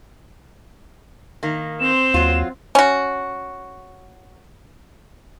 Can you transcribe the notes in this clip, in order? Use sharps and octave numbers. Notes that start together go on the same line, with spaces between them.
D#3 A#3
C4 C5 E7
D#2 F#3 F4
C#4 F#4